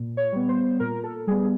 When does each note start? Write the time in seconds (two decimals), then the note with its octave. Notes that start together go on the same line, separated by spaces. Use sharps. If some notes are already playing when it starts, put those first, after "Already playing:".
Already playing: A#2
0.17 C#5
0.32 G3 B3
0.49 C5
0.80 A#2 A#4
1.04 A4
1.27 G3 B3 G#4